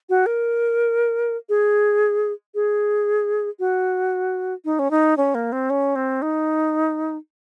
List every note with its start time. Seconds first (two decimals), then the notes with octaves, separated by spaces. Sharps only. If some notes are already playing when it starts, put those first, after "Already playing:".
0.09 F#4
0.26 A#4
1.49 G#4
2.55 G#4
3.59 F#4
4.65 D#4
4.79 C#4
4.91 D#4
5.17 C#4
5.35 A#3
5.52 C4
5.70 C#4
5.96 C4
6.22 D#4